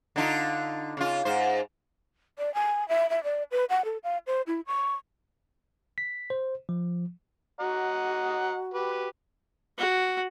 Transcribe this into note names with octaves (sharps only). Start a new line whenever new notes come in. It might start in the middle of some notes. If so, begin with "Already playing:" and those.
D3 D#4 F4
C#3 F4
G#2 C5
D5
G#5
E5
E5
D5
B4
F#5
A4
F5
C5
E4
C#6
B6
C5
F3
F#4 D#5 F#5 A#5
G4 B4
F#4